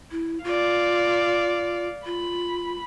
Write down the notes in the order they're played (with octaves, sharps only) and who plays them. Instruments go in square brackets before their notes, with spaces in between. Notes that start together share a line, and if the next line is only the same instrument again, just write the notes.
[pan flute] E4
[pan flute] F4 [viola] D5 F5
[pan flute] F4 [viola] B5